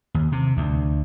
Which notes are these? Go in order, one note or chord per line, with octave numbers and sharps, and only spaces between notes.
D#2
C3
D2